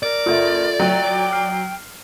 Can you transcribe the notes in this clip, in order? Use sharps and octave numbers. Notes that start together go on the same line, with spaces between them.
A#4 D5
F#1 F4 A4 E5
F#3 G5
F6 C7